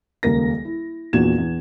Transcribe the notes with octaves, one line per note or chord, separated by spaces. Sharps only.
D#1 C#2 A#3 A#4 A#6
E4
A#1 E2 A#2 F#4 G#6 E7
E2